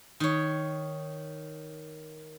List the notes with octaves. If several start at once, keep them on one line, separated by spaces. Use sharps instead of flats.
D#3 C#5